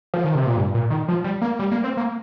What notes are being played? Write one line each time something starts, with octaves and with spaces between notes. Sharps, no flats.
F3
D#3
C3
A#2
G2
A#2
D#3
F3
G3
A#3
G3
A#3
C4
A#3